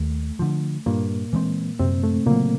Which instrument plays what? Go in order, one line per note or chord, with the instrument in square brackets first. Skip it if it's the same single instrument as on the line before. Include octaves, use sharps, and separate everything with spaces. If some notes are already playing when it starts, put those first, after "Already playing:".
Already playing: [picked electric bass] D#2 [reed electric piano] A3
[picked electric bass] D3 F3
[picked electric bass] G2 [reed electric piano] A#2 A#3
[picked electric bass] E3 G#3 C4
[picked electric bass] F#2 [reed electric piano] C3 C4
[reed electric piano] A3
[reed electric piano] A#2 A#3 [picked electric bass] C#3 F#3